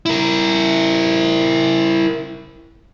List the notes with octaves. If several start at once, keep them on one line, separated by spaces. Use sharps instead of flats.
E4 A#4